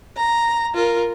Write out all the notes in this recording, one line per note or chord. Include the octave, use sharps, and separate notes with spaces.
A#5
F4 A#4